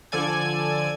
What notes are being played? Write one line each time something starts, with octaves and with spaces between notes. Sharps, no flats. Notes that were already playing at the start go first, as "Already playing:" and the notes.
D3 F3 A4 D5 G#5 G#6